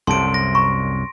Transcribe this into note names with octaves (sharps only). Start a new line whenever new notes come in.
C2 F#2 C3 A4 A5 C6 D7
A#6
A#5 B5 C#6